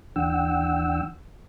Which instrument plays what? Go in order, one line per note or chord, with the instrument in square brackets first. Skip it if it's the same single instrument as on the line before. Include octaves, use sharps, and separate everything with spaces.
[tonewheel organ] D#2 E3 D4 F#5 G5 E6